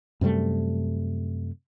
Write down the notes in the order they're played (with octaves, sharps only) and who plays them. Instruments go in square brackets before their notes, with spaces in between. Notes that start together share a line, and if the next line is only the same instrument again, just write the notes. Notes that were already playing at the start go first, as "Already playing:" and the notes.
[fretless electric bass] F#2 C3 G3 A3